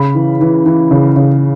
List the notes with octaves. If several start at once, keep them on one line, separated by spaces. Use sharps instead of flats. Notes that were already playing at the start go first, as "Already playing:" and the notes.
Already playing: C#3 B5
E3
E3
E3
C#3
C#3